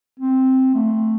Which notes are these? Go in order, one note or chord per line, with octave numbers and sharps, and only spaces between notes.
C4
A3